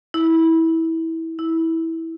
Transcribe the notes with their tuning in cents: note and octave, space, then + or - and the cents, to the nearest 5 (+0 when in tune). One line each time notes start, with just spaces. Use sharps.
E4 -20
E4 -15